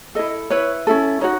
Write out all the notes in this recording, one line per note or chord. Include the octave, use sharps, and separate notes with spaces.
E4 A4 D#5
E4 B4 C#5
C#4 E4 A4
D#4 F#4 C#5